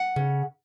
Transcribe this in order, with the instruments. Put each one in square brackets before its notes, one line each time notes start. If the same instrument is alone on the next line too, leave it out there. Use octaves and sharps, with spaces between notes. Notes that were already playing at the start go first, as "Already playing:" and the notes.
Already playing: [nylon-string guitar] F#5
C#3